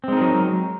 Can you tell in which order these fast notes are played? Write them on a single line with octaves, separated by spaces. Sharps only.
C4 G#3 D#4 A#4 F#3